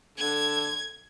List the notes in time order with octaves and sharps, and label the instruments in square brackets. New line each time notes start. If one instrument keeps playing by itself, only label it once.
[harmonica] D3 A4 [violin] G#6